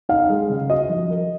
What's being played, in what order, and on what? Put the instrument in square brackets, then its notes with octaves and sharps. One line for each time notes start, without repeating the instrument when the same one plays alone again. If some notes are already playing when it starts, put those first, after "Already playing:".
[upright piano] D#4 [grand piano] F5
[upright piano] G#3
C#3
[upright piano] F#4 [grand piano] D#5
[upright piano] F3
A#4